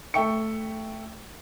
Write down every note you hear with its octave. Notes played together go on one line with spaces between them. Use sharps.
A3 E5 G5 C#6 C#7